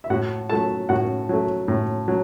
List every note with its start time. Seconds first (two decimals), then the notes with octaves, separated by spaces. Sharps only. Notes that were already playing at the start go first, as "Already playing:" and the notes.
0.04 E5
0.10 A2 F#4 F#5
0.50 F#3 A3 A4 A5
0.89 A2 F#4 F#5
1.29 F#3 A3
1.68 A2
2.08 F#3